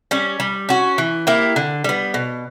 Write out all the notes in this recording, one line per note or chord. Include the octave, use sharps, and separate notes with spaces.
G3 C#4
G3
C#4 F#4
E3
A#3 E4 G4
D3
G3 B3
B2